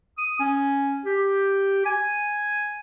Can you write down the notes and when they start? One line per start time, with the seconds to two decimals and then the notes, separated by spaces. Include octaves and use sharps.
0.18 D#6
0.40 C#4
1.06 G4
1.86 G#5